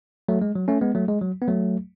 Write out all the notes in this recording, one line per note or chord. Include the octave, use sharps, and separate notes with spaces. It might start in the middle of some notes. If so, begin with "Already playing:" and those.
F#3 A3
G#3
F#3
A3 C#4
G#3 B3
F#3 A3
G#3
F#3
B3
F#3 A3